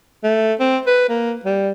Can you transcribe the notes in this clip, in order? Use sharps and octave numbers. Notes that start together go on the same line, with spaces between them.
A3
C4
B4
A#3
G3